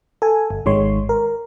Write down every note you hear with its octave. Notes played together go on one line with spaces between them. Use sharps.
A4 G#5
G1
G#1 D#3 G#3 C#5 C6
A#4